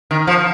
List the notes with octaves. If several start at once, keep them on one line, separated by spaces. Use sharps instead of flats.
D#3
F3